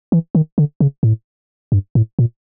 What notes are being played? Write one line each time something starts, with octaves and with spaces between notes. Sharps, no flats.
E3
D#3
D3
C#3
A2
G2
A2
A#2